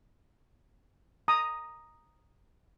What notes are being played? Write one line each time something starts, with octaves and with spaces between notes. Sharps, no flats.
A#5 D#6